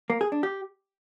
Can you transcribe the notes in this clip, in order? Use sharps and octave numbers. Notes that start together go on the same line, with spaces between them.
A#3
G#4
D4
G4